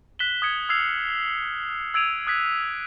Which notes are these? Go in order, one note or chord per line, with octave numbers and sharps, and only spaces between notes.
F#6 B6 E7 F#7 G7
D#6 G#6 C#7
E6 F6 G#6 C7 F7 F#7
E6 G#6 D7 D#7 F7
D#6 F#6 G#6 B6